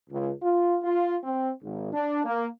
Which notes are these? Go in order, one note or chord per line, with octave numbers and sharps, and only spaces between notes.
C#2
F4
F4
C4
G#1
D4
A#3